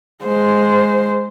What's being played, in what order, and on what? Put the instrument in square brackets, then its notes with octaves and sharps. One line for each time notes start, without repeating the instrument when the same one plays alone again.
[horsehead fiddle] G#3 C5